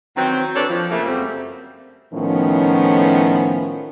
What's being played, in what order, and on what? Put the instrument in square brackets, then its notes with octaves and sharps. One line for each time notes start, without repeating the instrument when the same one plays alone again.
[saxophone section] D#3 E3 F#3 C4
D4 A4 B4 C#5 D5
F3
C#3 A3 A#3
F#2 G3 A3 C4
[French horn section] A2 D#3 F3 B3 C#4